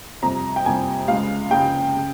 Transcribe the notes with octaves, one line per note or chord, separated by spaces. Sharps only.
F2 C3 G3 A#5
G5
F2 C3 G3 G#5
C#2 C#3 G#3 F5
C#2 C#3 G#3 G5
C#3